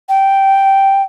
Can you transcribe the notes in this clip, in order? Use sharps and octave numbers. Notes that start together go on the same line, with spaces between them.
G5